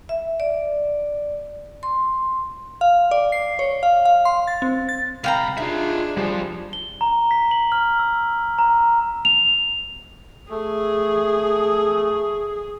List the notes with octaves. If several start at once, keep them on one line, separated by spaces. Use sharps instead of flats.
E5
D5
C6
F5
D5
C7
C#5
F5
F5
C6
A6
C4
A6
C2 F5 G5 A#5 B5
D4 D#4 F4 G#4 E5
F2 F3 G3
G7
A#5
B6
F#7
F6
E6
A#5
F7
A3 G#4